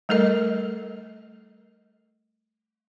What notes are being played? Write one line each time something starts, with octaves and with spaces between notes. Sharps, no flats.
G3 A3 A4 A#4 D#5